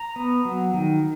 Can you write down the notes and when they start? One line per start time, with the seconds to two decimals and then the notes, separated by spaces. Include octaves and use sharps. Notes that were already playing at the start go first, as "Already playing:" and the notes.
Already playing: A#5
0.16 B3
0.45 F#3
0.74 D#3